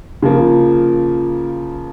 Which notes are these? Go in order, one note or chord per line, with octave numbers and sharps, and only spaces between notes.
C#3 F3 A#3